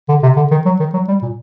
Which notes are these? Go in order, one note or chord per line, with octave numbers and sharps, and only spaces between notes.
D3
C3
D3
D#3
F#3
D#3
F#3
G3
A#2